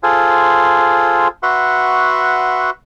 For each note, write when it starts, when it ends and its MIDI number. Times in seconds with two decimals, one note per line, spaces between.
0.03 1.28 65
0.03 1.28 68
0.03 1.28 69
0.03 1.28 72
1.43 2.70 66
1.43 2.70 71
1.43 2.70 76
1.43 2.70 78
1.43 2.70 84
1.43 2.70 85